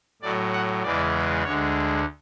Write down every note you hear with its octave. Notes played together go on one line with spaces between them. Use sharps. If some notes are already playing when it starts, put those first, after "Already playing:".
A2 F#3 D5
F#5
E2 C#3 E3 G#3 D5
D2 D3 G#3 C#5